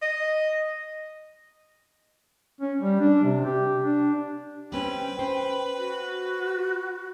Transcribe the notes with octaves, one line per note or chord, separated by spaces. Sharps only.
D#5
C#4
G3
D4
C3
G4
D4
G3 C4 C#4 B4 G5
C5
F#4